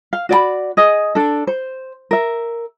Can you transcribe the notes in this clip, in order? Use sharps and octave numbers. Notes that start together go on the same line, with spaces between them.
F5
F#4 D5 G5 B5
G#4 D#5
D4 A4
C5
A#4 E5